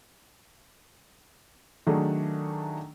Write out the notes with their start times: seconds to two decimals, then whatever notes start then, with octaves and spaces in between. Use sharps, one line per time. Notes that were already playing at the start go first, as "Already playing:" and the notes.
1.87 D#3 F#3 A3 D4 G#4